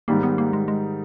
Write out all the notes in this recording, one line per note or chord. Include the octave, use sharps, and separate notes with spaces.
G#2 D#3 G3 A#3
B3
A#3
G#3
G#3